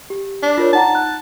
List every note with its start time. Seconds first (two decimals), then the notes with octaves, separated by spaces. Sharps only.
0.10 G4
0.43 D4
0.58 F4 A#4 C#5
0.73 D#4 F#5 A5 A#5
0.95 F#6